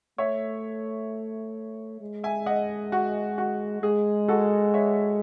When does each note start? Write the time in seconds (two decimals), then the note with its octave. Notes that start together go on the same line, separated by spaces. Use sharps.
0.18 A3 C#5 E5
2.01 G#3
2.24 E5 G#5
2.46 D#5 F#5
2.92 F#4
3.38 F#4
3.83 G#3 G#4
4.28 F#4 A4
4.74 C#5 E5